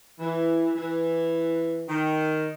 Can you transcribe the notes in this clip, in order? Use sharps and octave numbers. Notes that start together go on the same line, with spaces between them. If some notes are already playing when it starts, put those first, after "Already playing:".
E3
E3
D#3